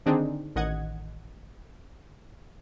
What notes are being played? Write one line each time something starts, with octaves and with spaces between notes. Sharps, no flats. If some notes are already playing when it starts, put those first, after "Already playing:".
D3 D#3 C4 D4 D#4 G#4
A1 D#3 D#5 F#5 G#6